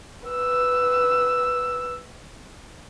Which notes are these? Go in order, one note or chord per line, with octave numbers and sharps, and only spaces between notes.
B4 E6